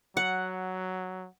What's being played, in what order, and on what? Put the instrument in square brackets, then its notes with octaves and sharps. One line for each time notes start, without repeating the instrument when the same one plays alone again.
[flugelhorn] F#3 [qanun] F#5